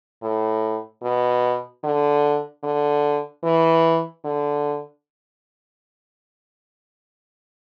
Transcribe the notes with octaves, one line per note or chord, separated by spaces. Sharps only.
A2
B2
D3
D3
E3
D3